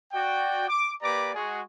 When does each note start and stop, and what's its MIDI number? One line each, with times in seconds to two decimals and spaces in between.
0.12 0.67 66
0.12 0.67 74
0.12 0.67 79
0.68 0.92 86
1.02 1.32 58
1.02 1.32 67
1.02 1.32 71
1.02 1.32 74
1.02 1.32 82
1.02 1.32 86
1.34 1.60 56
1.34 1.60 66
1.34 1.60 68